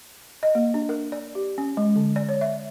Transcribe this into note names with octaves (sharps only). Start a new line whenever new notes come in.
D#5
A#3
D4
A#4
D5
G4
C#4
G#3
D3
D5
C#5
E5